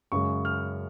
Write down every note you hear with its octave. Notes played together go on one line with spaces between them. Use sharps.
F#2 C#3 G#3 C#6
F6